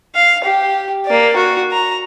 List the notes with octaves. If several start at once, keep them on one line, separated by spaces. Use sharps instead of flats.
F5
G4
A#3 D5
F#4
A#5